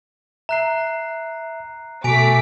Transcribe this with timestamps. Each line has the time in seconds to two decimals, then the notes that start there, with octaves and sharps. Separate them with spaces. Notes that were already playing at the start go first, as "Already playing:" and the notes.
0.49 E5 A#5 F#6 C7
2.04 B2 A3 G#5 D6 B6 D7